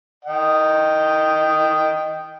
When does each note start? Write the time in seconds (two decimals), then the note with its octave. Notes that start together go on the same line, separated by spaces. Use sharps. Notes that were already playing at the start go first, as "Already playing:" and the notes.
0.25 D#5 G5